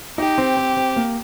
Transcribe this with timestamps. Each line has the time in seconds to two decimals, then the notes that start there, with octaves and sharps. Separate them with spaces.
0.18 D#4 G4
0.38 C4
0.57 C4
0.77 C4
0.96 A#3